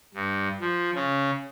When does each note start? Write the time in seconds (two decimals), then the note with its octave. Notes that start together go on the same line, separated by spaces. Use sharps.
0.14 G2
0.61 F3
0.95 C#3